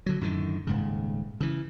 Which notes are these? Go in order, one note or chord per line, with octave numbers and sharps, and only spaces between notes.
D3 F#3
F#2 A2 D3 D#3
D#1 G#2 C#3
C#3 E3